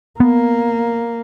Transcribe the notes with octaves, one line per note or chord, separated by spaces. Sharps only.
A#3 B3